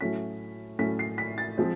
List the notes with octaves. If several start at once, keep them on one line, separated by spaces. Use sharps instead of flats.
A2 F#3 A3 C#4 B6
A2 F#3 A3 C#4 B6
C7
B6
A6
F3 G#3 C4